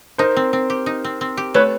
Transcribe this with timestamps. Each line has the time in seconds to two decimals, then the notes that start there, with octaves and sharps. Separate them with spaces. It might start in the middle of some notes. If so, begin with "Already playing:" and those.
0.18 D#4 A#4 C5
0.36 C4
0.53 C4
0.70 G4
0.86 D#4
1.04 C4
1.21 C4
1.37 G4
1.54 A3 B4 C#5